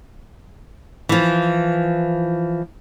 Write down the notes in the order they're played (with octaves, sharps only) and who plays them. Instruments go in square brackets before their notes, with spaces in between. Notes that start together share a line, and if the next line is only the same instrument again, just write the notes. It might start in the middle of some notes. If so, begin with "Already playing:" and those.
[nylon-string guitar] E3 F3